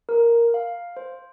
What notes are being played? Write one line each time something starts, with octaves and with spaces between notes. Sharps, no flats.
A#4
F5
C5